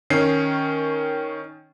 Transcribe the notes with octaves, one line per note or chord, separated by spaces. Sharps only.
D#3 C#4 C7